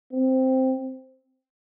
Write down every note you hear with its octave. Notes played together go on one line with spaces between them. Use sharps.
C4